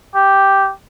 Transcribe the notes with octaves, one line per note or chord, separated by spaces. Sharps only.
G4